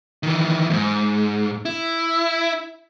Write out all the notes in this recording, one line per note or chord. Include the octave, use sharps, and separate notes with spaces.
D#3 E3
F2 G#2
E4